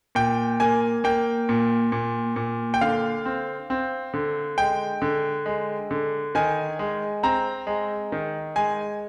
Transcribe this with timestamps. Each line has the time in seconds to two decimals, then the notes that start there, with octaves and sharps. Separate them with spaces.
0.15 A#2 G5
0.60 A#3 G#5
1.04 A#3 G5
1.49 A#2
1.92 A#2
2.36 A#2
2.74 G5
2.81 D3 F5
3.25 C4
3.70 C4
4.14 D3
4.58 G#3 G5
5.02 D3
5.46 G#3
5.91 D3
6.35 D#3 G#5
6.79 G#3
7.23 C4 A#5
7.67 G#3
8.12 D#3
8.56 G#3 G#5